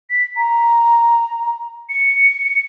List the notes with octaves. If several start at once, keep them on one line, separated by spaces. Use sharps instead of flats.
B6
A#5
C#7